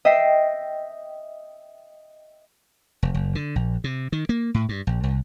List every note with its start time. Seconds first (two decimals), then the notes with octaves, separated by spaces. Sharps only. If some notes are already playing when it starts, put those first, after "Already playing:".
0.05 D#5 E5 G5 B6 C7
3.03 F1
3.14 F#1
3.35 D3
3.56 A#1
3.84 C3
4.12 D#3
4.29 A#3
4.54 A2
4.69 G2
4.87 A#1
5.03 C2